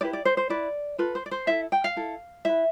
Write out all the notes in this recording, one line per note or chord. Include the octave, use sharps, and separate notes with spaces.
E4 G4 B4 D5
D5
C5
C5
E4 B4 D5
F4 A4 B4
C5
D5
C5
E4 A4 E5
G5
F5
E4 A4
E4 B4 E5